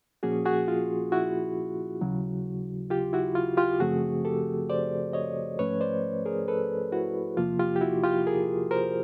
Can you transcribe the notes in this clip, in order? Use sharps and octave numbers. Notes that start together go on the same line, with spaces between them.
A#2 F3 A#3 C#4 F#4 G#4
F#4 G#4
F4
E4 F#4
D#2 C#3 F#3
F4 G4
E4 F#4
F4
F4 G4
F#2 C#3 F3 A3 C4 F#4 G#4
G4 A4
C5 D5
C#5 D#5
G#2 F3 A3 C#4 B4 C#5
C5 D5
G#4 A#4
A4 B4
E4 F#4
E2 C3 F3 A#3 F4
F4 G4
G4
E4 F#4
F4 G4
G#4 A#4
A#4 C5